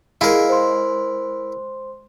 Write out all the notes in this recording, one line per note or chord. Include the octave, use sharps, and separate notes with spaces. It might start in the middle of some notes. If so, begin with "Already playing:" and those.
G#3 E4 A#4 F5
C5 C6